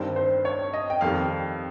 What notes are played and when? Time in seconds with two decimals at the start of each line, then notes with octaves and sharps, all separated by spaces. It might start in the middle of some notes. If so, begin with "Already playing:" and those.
Already playing: G2 D#3 G3 C4
0.16 C5
0.45 C#5
0.74 D#5
0.90 G5
1.01 F2 D#3 G3 F5